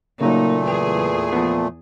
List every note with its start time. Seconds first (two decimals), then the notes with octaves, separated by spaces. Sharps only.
0.21 A#2 C#3 F#3 A3 A#3 D#4
0.66 E2 G#4 B4
1.33 F3 B3 A5